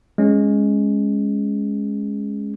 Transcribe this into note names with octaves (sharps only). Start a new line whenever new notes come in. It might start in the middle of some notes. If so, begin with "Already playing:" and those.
G#3 C#4